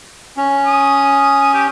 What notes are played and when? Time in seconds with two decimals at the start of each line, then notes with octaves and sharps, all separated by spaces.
0.37 C#4
0.66 D#6
1.54 G4